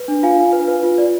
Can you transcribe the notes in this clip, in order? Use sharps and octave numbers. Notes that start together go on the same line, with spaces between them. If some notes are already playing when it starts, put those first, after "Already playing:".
Already playing: B4
D4
F4 F5 G#5
F4
B4
B4
F4
D5